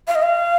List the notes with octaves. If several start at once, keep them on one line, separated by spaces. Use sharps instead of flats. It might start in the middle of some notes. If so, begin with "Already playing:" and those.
F5
D#5
F5